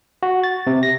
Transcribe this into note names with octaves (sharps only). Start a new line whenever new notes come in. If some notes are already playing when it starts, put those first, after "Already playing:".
F#4
A6
C3
A#6